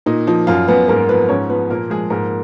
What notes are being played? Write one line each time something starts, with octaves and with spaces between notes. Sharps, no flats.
A#2 D#4
F3 D#4
F#2 F4
F#2 B3 B4
G#2 A#3 A#4
F3 B3 B4
G#2 C#4 C#5
F3 B3 B4
A#2 A#3 A#4
F3 G#3 G#4
G#2 A#3 A#4